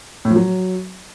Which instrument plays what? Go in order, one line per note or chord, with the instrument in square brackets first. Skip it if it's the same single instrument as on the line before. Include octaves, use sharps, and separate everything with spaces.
[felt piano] A2
F3
F#3